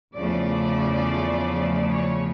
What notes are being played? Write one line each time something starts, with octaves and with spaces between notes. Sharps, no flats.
E2 C#3 F3 A3 D5
C#5